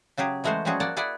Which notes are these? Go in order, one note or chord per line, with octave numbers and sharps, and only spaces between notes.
C#3 F#3 G4 G#4
E3 G#3 A3 F#4 C5
F3 G3 C#4 F#4 G#4
A#3 D5 F#5 A5
E4 G#4 D5 F#5